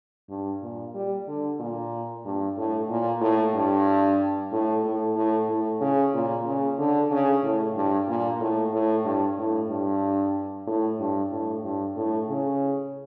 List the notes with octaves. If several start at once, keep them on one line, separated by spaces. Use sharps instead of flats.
G2
A#2
G3
D3
A#2
G2
A2
A#2
A2
G2
A2
A2
A2
A2
C#3
A#2
C#3
D3
C#3
A2
G2
A#2
A2
A2
G2
A2
G2
A2
G2
A2
G2
A2
C#3